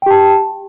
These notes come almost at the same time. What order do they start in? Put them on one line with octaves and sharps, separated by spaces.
G5 G4 A5